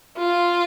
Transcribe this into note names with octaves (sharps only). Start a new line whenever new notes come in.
F4